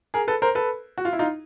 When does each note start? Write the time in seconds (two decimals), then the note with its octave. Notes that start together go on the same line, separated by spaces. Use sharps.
0.14 G#4 A#4
0.28 A4 B4
0.42 A#4 C5
0.55 A4 B4
0.98 F#4
1.05 F4
1.13 E4
1.19 D#4 F4